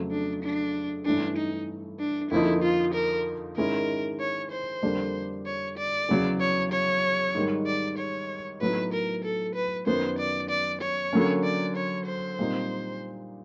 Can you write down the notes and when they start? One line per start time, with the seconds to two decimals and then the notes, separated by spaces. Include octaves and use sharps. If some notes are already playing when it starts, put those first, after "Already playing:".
Already playing: F2 C#3 F#3 A3
0.11 D4
0.43 D4
1.05 G2 E3 A3 C#4 D4
1.37 D#4
2.00 D4
2.31 F2 D3 F3 A#3 D#4 E4
2.63 F4
2.94 A#4
3.57 G#2 D#3 G#3 C#4 E4 A#4
4.20 C#5
4.52 C5
4.83 F2 D3 G3 A#3 D4
5.46 C#5
5.77 D5
6.09 E2 C#3 F#3
6.40 C#5
6.72 C#5
7.35 G#2 D#3 G3
7.66 D5
7.98 C#5
8.61 A2 F#3 B3 D#4 B4
8.93 A#4
9.24 A4
9.55 B4
9.86 F#2 D#3 F#3 B3 C5
10.19 D5
10.50 D5
10.81 C#5
11.13 D3 F#3 A#3 C#4
11.44 D5
11.76 C#5
12.07 C5
12.39 A#2 G3 C4 D#4